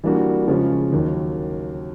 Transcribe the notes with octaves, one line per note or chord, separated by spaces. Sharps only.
E3 G3 A#3 D4 F#4
C#3 F3 G#3 C#4
D#2 D#3 F#3